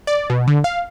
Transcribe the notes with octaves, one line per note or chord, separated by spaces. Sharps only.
D5
B2
D3
F5